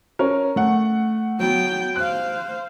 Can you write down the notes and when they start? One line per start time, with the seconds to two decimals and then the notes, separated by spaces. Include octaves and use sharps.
0.19 C#4 A#4
0.56 A3 F#5
1.39 F#3 B3 G5
1.96 C5 F5 F#6